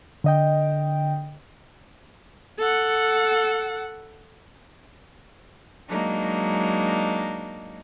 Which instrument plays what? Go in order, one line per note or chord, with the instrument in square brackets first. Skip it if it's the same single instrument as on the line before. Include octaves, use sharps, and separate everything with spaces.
[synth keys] D3 D#5 G5
[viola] A4 F#5
[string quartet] F#3 G#3 A#3 D4 D#4